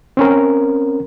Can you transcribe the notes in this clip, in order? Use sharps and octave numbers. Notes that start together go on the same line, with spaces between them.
C4 C#4 A#4